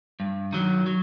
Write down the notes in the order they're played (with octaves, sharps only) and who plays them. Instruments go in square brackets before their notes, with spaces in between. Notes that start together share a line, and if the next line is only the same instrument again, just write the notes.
[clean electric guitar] G2
D#3 F#3
F#3